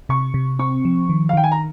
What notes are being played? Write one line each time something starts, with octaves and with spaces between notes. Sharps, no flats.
C3 C#6
C3
C4 C#6
F3
D#3
F5
D#3 G5
G#5
A#5